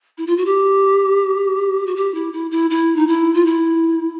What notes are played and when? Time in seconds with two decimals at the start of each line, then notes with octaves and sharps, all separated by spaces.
0.18 E4
0.27 F4
0.37 F#4
0.46 G4
1.87 F#4
1.96 G4
2.14 E4
2.33 E4
2.51 E4
2.70 E4
2.96 D#4
3.07 E4
3.34 F4
3.46 E4